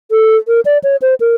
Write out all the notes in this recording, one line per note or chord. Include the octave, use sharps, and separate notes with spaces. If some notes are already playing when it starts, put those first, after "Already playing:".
A4
A#4
D5
C#5
C5
A#4